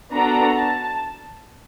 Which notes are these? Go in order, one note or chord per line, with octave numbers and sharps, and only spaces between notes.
B3 D4 F#4 A4 A#5
A5